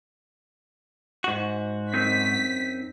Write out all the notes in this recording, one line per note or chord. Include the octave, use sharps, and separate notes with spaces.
G#2 F#4
F#2 C4 D#4 B6